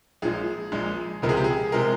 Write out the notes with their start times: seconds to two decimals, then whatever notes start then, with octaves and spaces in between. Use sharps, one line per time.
0.22 A#1 A#2 F3 G#3 G#4
0.72 A#1 A#2 F3 G#3
1.22 C#2 C3 F3 G#3 A#4
1.29 G#4
1.37 G4
1.44 G#4
1.72 C3 F3 G#3 A#4